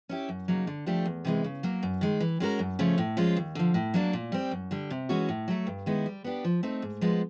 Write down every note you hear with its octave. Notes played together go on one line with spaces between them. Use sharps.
C#4 E4 G4
F#2
C#3 F#3 A#3 D#4
D3
F3 A3 D4 G4
E2
C3 E3 G#3
C#3
F#3 A#3
F#2
D#3 G#3
E3
G#3 C#4 F#4 A#4
F#2
C#3 F3 A3 C#4
A2
F3 G#3 C#4 F4
D#2
D3 F3
A2
F#3 A#3 D4
A#2
G3 C4
F#2
D3 G3
C3
E3 G#3 C#4 F#4
A2
F#3 A3
G2
D#3 G#3 B3 E4
G3
B3 D4 G4
F3
A3 C4 D#4
G#2
F3 G#3 B3